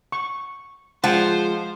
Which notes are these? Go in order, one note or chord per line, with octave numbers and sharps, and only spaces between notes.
C#6
F3 G#3 F4 G#4 C5 F#5 G5 A5